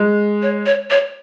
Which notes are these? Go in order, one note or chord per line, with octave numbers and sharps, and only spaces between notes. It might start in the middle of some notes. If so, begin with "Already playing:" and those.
Already playing: G#3
C#5
C#5
C#5